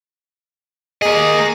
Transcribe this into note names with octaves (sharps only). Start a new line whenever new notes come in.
A#3 G#4 D#5